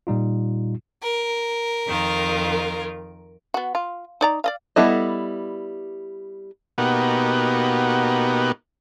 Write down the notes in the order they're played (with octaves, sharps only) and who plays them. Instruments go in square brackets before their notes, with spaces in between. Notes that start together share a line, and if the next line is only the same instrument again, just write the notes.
[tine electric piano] A#2 G3 D#4 F4
[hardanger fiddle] A#4
[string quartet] F2 D#3 F4
[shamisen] B3 F#4
F4
D#4 D5 A#5
D5 D#5 F5
[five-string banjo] G3 B3 E4 A4 D#5
[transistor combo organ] B2 A#3 B3 D#4 F#4 G4